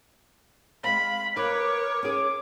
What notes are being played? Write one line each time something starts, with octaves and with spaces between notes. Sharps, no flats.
G#3 C4 F5 B5
A#4 B4 C#5 D6
C#4 G#4 D6